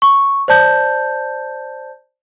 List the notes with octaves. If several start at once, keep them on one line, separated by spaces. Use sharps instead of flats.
C#6
C5 D5 A5 G6